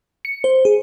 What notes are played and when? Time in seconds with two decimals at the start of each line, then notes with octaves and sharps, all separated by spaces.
0.25 C#7
0.44 C5
0.65 G#4